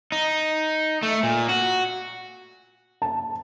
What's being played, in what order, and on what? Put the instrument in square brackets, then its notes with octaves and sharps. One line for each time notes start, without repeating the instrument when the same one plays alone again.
[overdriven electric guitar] D#4
A3
A#2
F#4
[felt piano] A5